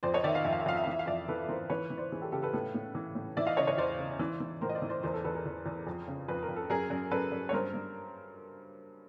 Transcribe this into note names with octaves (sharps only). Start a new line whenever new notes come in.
F2 C5 D5
C#5 D#5
D#3 D5 E5
D#5 F5
F2 E5
F5
E5
F2 F5
E5
F5
E3 E5
F5
F2 D5 E5
E3 A4 B4
E3 A#4 C5
E3 B4 C#5
E3
C5 D5
E3 G#4
G4 A4
C#3 G4 A4
A4 B4
A2 A4 B4
A2
E3
A2
E3 D5 E5
D#5 F5
C#3 C#5 D#5
C#5 D#5
E2 C5 D5
C#3
E3
E3
A2 A#4 C5
D#5
C5 D5
E3
C5 D5
E2 A#4 C5
A4 B4
E2 A4 B4
G#4 A#4
E2
E2
F2
C#3
F2 B4
A#4
F2
A4
F#2 G#4 A#4
F#2
F#2 A4 B4
F#2
C#5
G2 A#4 C5
G2